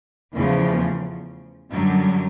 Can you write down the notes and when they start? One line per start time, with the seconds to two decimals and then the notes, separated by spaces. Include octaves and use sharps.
0.34 E2 C#3 F3 A3
1.71 F#2 D3 F#3 G3